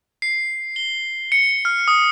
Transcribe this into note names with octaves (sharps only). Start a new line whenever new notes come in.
C7
G7
C#7
F6
D#6